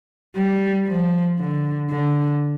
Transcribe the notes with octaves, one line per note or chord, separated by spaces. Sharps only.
G3
F3
D3
D3